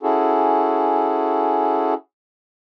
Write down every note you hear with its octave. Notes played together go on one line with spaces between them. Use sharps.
C#4 E4 F#4 G#4 A4